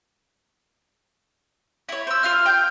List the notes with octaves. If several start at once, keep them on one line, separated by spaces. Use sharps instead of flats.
E4 C#5
C5 E6
F4 F5 F6
G5 G6